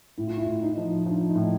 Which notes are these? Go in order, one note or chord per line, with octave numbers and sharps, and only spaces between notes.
A2 E4
F4
E4
A2
D#4
F3
F3 D4
D#4
A2